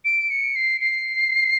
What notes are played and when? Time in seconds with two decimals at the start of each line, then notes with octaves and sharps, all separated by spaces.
0.05 D7
0.30 C#7
0.56 C7
0.81 C7